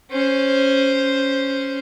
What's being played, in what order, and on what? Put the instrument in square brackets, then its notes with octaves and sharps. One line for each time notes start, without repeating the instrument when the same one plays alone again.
[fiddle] C#4 C5